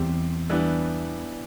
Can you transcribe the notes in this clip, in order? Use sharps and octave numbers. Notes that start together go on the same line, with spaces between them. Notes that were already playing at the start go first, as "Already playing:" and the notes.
Already playing: E2 C3 G3 C4 G4 C5
E3 G3 B3 D4